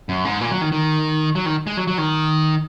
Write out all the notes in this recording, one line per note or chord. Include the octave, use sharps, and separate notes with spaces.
F#2
G#2
A#2
F#3
D#3
D#3
F#3
D#3
G#3
F#3
F#3
D#3